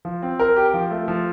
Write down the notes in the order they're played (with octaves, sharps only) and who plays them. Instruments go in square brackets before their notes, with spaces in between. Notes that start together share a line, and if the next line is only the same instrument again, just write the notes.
[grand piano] F3
C4
A#4
G4
F3
A3
F3